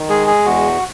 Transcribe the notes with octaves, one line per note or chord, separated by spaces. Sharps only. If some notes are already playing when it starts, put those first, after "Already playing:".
Already playing: D#3
G#3 G#4
G#4
E2 F#4